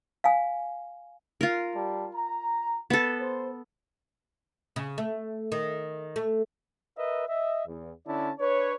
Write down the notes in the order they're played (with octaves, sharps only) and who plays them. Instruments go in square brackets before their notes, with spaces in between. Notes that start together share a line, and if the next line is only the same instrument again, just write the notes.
[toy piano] F5 G#5
[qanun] F4 A#4
[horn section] G3 A5
A#5
[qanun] B3 A4
[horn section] C5
[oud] C#3
A3
D#3
A3
[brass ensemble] A#4 B4 D#5 E5
D#5 E5
E2
D3 C#4 E4 D5 A5
D4 B4 C#5